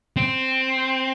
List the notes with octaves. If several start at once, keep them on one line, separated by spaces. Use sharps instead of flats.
C4